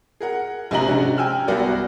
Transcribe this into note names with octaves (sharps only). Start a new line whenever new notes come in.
G#4 A#4 F#5
A#1 G#2 C3 D#5 A#5 F#7
C3 C#4 D4 F#4 G#4
G5 G#5 E6 F6
C2 B3 F#4 A#4 D5